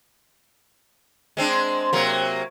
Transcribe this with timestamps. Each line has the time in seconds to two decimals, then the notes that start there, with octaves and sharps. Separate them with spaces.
1.37 G#3 C4 D4
1.93 C3 F#3 A#3